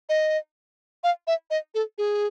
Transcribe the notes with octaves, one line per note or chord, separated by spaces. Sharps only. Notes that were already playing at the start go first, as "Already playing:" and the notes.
D#5
F5
E5
D#5
A4
G#4